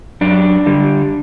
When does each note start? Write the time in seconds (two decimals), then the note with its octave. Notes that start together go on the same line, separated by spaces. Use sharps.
0.21 F#2 D4
0.66 D3 G3